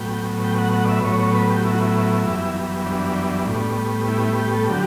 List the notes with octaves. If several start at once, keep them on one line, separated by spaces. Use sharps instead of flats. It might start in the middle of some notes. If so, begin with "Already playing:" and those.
Already playing: A2 F#3 B3 G5
G5
F#5
F#5
D5
E5
B4
A2 F#3 B3 C#5
C#5
B4
G4
E4
F#4
E4
F#2 E3 G3 B3
D4
A2 G3 B3
E4
E4
G4
A4
D3 F#3 G4